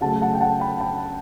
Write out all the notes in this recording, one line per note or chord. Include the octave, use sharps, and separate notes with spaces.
C#3 F#3 A3 F#5 A5
F#5 A5
G5
F#5 A5
G5 B5
G5 B5